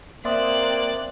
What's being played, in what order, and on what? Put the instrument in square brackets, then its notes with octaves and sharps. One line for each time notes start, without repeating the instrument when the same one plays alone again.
[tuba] A#3 [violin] C4 F#6 [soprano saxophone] D5 [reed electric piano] E5 C6 D#6